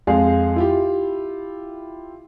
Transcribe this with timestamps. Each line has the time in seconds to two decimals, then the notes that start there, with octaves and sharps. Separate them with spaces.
0.07 F2 G#3 G#4 F5
0.56 E4 F4 G4